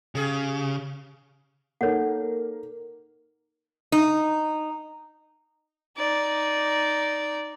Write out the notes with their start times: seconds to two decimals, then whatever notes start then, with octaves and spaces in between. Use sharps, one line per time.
0.15 C#3 G4 G#4
1.81 A#3 D#4 A4 C#5 F#5
3.92 D#4
5.97 D#4 D5